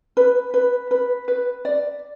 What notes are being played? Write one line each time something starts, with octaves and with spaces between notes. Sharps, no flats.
B4
B4
B4
B4
D5